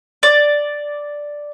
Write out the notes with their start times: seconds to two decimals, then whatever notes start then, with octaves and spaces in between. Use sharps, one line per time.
0.23 D5